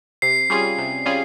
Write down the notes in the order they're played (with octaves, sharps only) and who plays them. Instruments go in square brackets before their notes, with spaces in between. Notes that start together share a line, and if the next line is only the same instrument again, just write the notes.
[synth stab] C3 [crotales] C7
[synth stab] G3 C#4 F4 G#4
C3
G3 C#4 F4 G#4